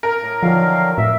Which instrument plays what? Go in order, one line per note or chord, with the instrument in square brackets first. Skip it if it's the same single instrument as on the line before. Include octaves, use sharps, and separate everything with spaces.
[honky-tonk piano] A#4
[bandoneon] A2
[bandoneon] D3 D#3 F#3 [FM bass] F3 [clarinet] F5
[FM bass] A2 [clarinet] E5